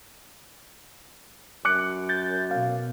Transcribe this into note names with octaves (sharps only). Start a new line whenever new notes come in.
F#2 D6 F#6 C#7
G6 A6
B2 F5